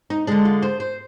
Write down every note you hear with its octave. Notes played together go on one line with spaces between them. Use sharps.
D#4
D3 G#3 D4
F4
C5
C5